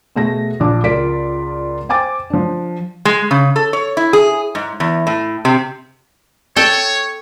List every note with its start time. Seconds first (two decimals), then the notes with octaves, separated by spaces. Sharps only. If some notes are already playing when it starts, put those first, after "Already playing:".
0.16 B2 A3 G#4 A#6
0.60 A#1 D4 A5 D6
0.84 C#2 F4 A#4 D5 B6 D7
1.89 C5 G5 G#5 D6 A6
2.30 F3 D4
3.05 G#3
3.31 C#3
3.56 A4
3.73 C#5
3.97 E4
4.13 G#4
4.55 G#2
4.80 E2
5.07 A2
5.45 C3
6.56 A4 C#5 G5